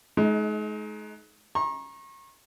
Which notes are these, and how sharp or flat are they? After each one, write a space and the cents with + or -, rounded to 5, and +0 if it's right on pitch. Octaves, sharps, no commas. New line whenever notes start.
G#3 +40 D#4 +10
A#5 +15 C#6 -35